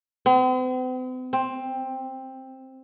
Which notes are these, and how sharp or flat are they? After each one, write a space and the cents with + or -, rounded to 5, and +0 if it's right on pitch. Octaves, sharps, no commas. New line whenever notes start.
C4 -45
C4 +10